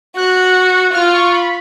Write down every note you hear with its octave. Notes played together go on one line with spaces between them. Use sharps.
F#4 F#6
F4 F6
C#6
B5